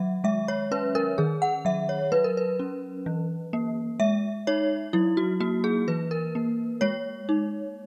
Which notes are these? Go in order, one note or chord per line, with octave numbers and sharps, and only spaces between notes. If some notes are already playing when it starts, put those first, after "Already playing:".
Already playing: D#3 F#3 E5 F#5
G#3 E5
C#5
C#4 B4
A#4
D#3 G#4
F#5
F#3 E5
C#5
F#3 B4
A#4
B4
C#4
E3
A#3
G#3 E5
D#4 C#5
F#3 E4
F#4
A#3 F#4
G#4
E3 B4
A#4
A#3
G#3 C#5
D#4